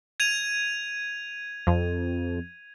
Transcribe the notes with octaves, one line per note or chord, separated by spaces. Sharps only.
G#6 D#7 F7
F2